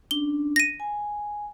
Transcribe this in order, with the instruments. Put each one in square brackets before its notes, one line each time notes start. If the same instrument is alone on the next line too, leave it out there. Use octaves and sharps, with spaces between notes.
[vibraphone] C#4 D4 [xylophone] G7
[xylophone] A#6 D#7
[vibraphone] G#5